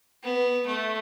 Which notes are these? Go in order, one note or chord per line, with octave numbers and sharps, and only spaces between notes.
B3
A3